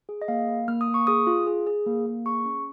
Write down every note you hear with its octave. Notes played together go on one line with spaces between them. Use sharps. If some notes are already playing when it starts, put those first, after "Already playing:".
G#4
D#5
A#3 F5
A#3
A#3 F6
D#6
A#3
C#6
G#4 D#6
F4
G#4
G#4
A#3
A#3
G#4 C#6
C#4